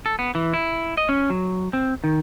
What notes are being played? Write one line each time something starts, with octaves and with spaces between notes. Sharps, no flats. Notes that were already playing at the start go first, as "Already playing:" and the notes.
A4
B3
E3
E4
D#5
C#4
F#3
C4
D#3